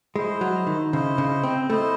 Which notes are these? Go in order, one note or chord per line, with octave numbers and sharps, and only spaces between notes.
G#3 E4 C5 D#5
F#3
D#3
C#3 E4 C5 D#5
C#3
C4
A3 E4 C5 D#5